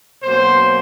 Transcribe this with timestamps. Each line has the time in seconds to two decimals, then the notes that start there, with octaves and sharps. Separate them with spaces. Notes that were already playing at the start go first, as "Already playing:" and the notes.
0.23 B2 F#3 A#3 C#4 C5